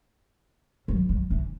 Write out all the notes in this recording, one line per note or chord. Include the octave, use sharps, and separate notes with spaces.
F#3
F#3
E3